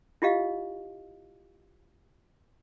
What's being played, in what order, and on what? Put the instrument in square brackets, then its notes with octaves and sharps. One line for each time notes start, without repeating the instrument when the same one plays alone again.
[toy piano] E4 F4 G4 D#5 F5